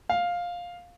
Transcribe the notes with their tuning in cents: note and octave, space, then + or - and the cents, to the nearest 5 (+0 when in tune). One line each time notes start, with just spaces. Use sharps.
F5 +10